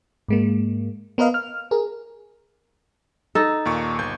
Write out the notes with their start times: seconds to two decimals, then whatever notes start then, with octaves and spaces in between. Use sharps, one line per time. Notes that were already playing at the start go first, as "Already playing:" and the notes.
0.29 G#2 G#3 A#3
1.18 B3 A#4 B4 D#5 F5
1.34 F6
1.71 G#4 A#4
3.35 D#4 A4
3.65 D#2 A#2 C#6
3.99 G1 G6